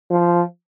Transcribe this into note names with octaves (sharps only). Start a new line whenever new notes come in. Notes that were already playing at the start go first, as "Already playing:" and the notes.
F3